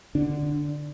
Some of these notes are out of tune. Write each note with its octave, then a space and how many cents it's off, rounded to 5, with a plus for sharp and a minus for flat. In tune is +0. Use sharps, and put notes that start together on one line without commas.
D3 +10 D4 +0